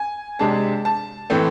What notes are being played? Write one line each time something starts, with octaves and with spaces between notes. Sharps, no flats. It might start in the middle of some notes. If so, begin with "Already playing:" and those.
Already playing: G#5
C3 G#3 D4 A5
A5
A2 E3 A3 C4